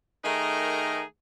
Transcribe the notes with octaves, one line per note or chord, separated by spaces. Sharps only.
D#3 A3 D#4 G#4 A#4 A#5